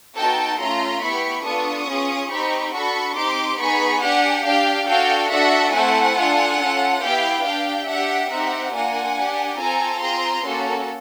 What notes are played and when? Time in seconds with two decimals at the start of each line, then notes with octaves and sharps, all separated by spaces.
0.16 B3 D#4 F#4 A4 G5 A5
0.59 A3 C#4 F4 A#5 C6
1.02 B3 E4 G4 B5 C#6
1.45 B3 D4 F4 A4 C#6 D#6
1.88 C#4 F4 G#4
2.31 C4 D#4 G4 B5 C#6
2.74 D4 F#4 A4 B5 C#6
3.16 C4 D#4 G4 C6 D6
3.59 B3 D#4 G#4 B5 C#6
4.02 D4 G4 F#5 G#5
4.45 D4 G4 F5 G5
4.87 D4 F#4 A4 F5 G5
5.30 D4 F#4 A4 E5 F#5
5.73 A3 C4 E4 A4 F#5 G#5
6.16 D4 F4 A4
6.59 C#4 F4 A4
7.01 B3 E4 G4 F5 G5
7.45 D4 G4 F5 G5
7.87 D4 G4 E5 F#5
8.30 C4 D#4 G4 E5 F#5
8.73 A#3 D4 F4 F#5 G#5
9.17 D4 G4
9.58 C4 F4 A4 G#5 A#5
10.01 C4 F4 G#4 A#5 C6
10.45 A#3 C#4 F#4 A4